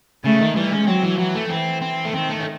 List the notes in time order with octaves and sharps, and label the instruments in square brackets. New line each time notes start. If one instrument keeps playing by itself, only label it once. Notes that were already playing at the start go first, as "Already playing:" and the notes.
[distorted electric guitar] C#3 [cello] A3
[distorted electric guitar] D#3
[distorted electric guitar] E3 [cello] G#3
[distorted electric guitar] C#4
[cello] F#3 [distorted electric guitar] C4
[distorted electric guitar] E3
[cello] E3 [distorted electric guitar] F#3
[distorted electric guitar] A3
[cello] E3 [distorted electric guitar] C4
[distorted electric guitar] C4
A3
[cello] D#3 [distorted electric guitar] C4
[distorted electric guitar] A3
C#4